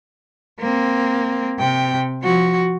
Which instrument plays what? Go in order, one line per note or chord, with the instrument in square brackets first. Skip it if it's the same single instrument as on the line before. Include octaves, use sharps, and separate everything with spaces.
[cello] A#3 C4
C3 G5
F3 F#4